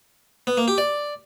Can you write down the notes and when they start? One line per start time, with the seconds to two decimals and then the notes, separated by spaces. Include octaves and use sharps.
0.47 B3
0.57 A#3
0.68 G4
0.78 D5